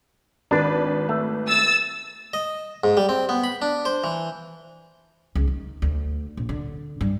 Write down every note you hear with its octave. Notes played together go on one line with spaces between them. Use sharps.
G#1 D4 B4
A3
E6 A6
D#5
G#2
G3
C4
B3
B5
D4
C5
E3
C#2
D#3
D2
A#1
D3
G2